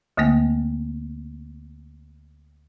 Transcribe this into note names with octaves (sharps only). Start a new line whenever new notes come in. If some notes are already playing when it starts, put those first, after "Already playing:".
D2 D3 A3 A#3 G5